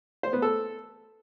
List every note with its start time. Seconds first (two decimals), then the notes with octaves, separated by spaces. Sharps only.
0.23 C5
0.33 B3
0.42 A4